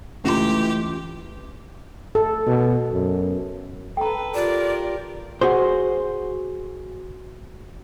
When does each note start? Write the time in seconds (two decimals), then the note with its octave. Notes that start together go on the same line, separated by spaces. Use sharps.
0.24 C#2 E3 A3 F4 G4 C6
2.15 A4
2.47 B2
2.92 F#2
3.97 A4 B4 G5 A#5
4.35 F4 G4 A#4 D5
5.41 F#4 G#4 C5